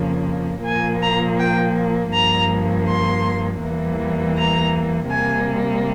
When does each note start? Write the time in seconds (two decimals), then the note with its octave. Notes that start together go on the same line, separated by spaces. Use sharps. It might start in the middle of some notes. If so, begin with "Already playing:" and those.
Already playing: F2 C#3 F3 A#3
0.64 A#2 F3 A#3 G#5
1.01 A#5
1.38 G5
2.13 G2 F3 A#3 A#5
2.87 C6
3.61 E2 E3 G3 A#3
4.36 A#5
5.10 C3 G3 A#3 G#5